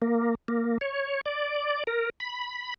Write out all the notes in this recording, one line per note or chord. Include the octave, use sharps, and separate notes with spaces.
A#3
A#3
C#5
D5
A#4
B5